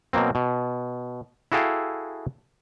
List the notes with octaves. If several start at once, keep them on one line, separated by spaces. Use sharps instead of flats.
B2 F#3 A#3 C4
B2
E4 F#4 G#4 A4 F5 G5